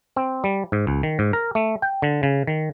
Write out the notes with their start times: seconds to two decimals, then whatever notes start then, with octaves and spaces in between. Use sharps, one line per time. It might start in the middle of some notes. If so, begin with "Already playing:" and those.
0.16 C4
0.44 G3
0.72 G#2
0.87 C#2
1.03 D#3
1.19 G#2
1.33 A#4
1.55 A3
1.82 G5
2.02 D3
2.23 C#3
2.47 D#3